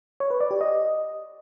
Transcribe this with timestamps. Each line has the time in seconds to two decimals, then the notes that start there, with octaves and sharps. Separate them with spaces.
0.20 C#5
0.30 B4
0.41 D5
0.51 G4
0.61 D#5